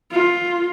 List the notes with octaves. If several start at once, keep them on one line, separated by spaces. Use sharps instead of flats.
F4